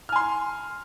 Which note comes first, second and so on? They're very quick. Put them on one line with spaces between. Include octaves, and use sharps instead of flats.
F6 G#5 C6